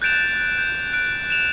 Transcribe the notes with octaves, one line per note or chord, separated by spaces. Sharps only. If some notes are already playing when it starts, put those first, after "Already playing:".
F#6 G6 A6 D7 E7 F7
G6
F#6 D7
E7 F7